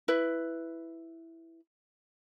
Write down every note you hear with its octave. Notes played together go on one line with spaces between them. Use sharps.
E4 B4